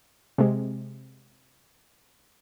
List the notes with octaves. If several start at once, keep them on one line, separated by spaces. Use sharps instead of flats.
C3 G#3